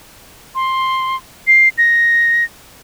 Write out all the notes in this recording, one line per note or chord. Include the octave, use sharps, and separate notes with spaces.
C6
C7
A#6